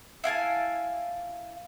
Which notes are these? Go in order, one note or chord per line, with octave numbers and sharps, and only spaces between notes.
E4 F5 G#5 A5